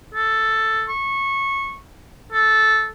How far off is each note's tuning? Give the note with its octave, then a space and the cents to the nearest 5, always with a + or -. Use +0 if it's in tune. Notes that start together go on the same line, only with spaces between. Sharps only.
A4 +5
C#6 -15
A4 -10